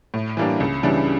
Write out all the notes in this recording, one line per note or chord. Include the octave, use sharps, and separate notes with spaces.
A2
E3 G3 A#3 D4
C#2
C#3 E3 G3 D4